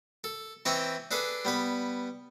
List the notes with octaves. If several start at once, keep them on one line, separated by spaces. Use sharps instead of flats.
A4
E3 C4 E4 D#5 G5 C#6
D4 G#4 A4 B4 D5
G3 B3 B4